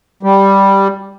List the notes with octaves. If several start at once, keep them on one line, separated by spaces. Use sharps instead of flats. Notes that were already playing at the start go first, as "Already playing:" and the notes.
G3